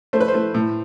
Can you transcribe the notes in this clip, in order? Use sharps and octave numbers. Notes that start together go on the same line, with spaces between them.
A3 C5
B4
C5
A3
A2